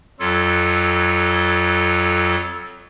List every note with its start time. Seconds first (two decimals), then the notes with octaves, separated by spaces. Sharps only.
0.20 F2 F#3 F4 A4